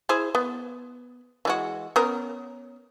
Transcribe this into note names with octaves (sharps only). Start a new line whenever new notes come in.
E4 G#4 C5
B3
E3 G#3 F#4
B3 C#4 A#4